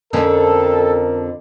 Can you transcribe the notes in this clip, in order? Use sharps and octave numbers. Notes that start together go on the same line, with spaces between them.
F2 D3 C#4 A4 A#4